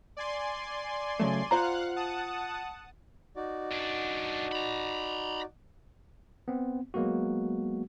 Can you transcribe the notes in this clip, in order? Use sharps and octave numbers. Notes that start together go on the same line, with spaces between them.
D5 G#5 C6
C#3 F#3 A3
F4 C5 F5 F#5 A#5 F#6
F#5 A5 D#6
D#4 F#4 D5
F#2 D4
A#5 B5
B3 C4
F#3 G#3 A#3 B3 F#4